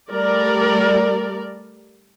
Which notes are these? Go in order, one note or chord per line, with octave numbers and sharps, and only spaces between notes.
G3 A3 A#4 D5